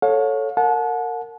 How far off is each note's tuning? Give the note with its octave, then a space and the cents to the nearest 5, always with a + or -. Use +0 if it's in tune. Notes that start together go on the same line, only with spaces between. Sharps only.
A4 +0 C#5 +0 F5 +40
A#4 -25 F#5 -30 A5 -35